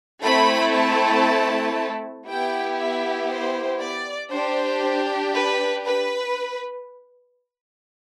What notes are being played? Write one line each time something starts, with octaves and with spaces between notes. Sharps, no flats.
A3 C4 E4 A4 B5
A5
B3 E4 G4 G5
E5
C5
D5
D4 G4 C5
B4
B4